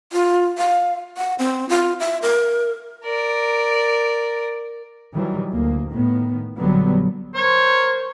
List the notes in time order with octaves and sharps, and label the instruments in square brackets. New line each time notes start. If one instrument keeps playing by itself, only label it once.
[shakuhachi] F4
F5
F#5
C4
F4
E5
A#4
[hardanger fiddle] A#4 D5
[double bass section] D#3 E3 F#3 G3
D2 A#3
A2 D#3 B3
A#1 D3 F#3 G3 B3
[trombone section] A#4 C5 [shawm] C#5